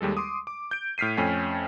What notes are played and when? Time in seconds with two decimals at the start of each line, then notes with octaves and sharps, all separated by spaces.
0.01 D#2 G3 G#3 A4
0.17 C6 D6 D#6
0.47 D6
0.71 G6 D7
0.98 A2 F6 B6 C7 D#7
1.17 F2 A3 C#4 G5 G#5 B6